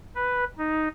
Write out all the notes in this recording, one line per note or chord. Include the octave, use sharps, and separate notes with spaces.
B4
D#4